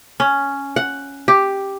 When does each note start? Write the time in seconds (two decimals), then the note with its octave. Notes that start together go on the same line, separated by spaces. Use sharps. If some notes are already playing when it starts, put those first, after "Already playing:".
0.20 C#4
0.76 F#5
1.28 G4